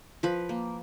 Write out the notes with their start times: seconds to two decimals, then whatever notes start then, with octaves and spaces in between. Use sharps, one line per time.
0.23 F3 B4
0.49 A#3